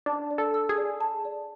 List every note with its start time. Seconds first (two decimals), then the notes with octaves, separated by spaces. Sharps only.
0.06 D4 A5
0.31 D5
0.38 A4
0.54 E6
0.69 G#4
0.78 D5
1.01 A5
1.25 D5